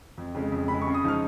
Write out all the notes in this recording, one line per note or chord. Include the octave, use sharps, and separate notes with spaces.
F2
C#3 G#3
F2
C#3 G#3 B5
C#6
C#3
D#6
F3 G#3 D#4 F6